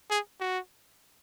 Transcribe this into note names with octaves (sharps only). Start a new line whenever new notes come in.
G#4
F#4